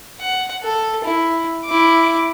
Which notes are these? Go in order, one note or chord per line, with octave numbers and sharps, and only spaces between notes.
F#5
A4
E4
E4 D6